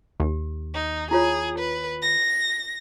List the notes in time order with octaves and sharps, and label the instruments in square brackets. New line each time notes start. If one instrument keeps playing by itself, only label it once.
[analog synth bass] D#2 [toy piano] G4
[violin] D#4
[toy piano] E4 F4 C#5 [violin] G#4
[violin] B4
A#6